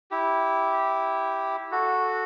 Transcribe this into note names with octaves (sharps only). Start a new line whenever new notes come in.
E4 G4
F#4 A4